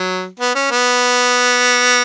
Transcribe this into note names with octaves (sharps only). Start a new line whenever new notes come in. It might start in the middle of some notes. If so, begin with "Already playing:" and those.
Already playing: F#3
B3
C#4
B3